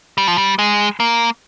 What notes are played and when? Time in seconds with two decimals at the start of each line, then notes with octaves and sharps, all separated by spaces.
0.18 G3
0.28 F3
0.38 G3
0.59 G#3
1.00 A#3